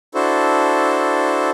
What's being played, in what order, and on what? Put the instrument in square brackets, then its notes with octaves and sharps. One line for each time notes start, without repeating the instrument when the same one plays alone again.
[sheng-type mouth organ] D4 E4 F#4 A4 C5